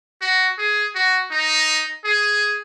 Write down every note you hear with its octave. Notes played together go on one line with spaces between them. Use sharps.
F#4
G#4
F#4
D#4
G#4